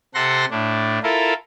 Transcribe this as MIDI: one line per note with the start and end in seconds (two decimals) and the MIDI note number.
0.14 0.45 48
0.14 0.45 69
0.14 0.45 78
0.14 0.45 84
0.14 0.45 94
0.50 0.99 45
0.50 0.99 62
1.03 1.34 64
1.03 1.34 65
1.03 1.34 69
1.03 1.34 70